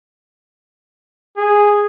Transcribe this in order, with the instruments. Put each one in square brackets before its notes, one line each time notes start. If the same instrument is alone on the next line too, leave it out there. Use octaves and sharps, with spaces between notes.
[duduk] G#4